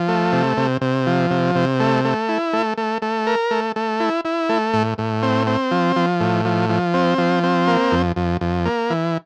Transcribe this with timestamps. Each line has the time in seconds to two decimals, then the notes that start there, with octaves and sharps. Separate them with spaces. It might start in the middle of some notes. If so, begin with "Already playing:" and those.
Already playing: F3
0.08 A3
0.33 C3
0.57 C3
0.81 C3
1.06 F3
1.31 C3
1.55 C3
1.80 A3
2.05 A3
2.29 E4
2.53 A3
2.78 A3
3.02 A3
3.27 A#4
3.51 A3
3.76 A3
4.00 E4
4.25 E4
4.49 A3
4.74 A2
4.98 A2
5.22 C4
5.47 C4
5.71 F3
5.96 F3
6.20 A2
6.45 F3
6.70 F3
6.94 C4
7.18 F3
7.43 C4
7.67 A#3
7.92 F2
8.16 F2
8.41 F2
8.66 A#3
8.90 E3